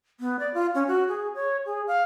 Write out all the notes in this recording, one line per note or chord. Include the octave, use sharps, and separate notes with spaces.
B3
D5
F4
C#4
F#4
G#4
C#5
G#4
F5